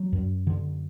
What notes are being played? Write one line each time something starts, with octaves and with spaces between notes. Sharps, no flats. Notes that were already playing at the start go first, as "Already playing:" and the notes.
Already playing: F#3
F#2
D3